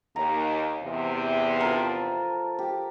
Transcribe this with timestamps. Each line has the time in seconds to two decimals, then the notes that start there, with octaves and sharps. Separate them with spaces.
0.16 D#2 A#5
0.83 E2 C3
1.61 F3 A4 A#4
2.59 G4